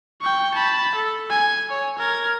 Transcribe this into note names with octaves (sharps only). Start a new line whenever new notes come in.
G5 C#6
A5 B5
A4
G#5
C#5
A#4 G#6